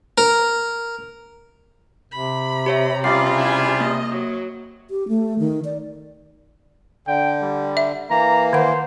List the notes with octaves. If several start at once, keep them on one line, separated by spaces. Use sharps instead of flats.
A#4
C3 B5
G4 C#5 E5
C#3 G3 F4 D5 C7
E4 G#5
A#3 D#5
F#3
G4
A3
D#3
D5
D3 G5
G3
E5
E3 A#3 A#5
D#3 C5 F#5